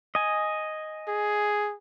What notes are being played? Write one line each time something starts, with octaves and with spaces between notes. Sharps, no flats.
D#5 G#5
G#4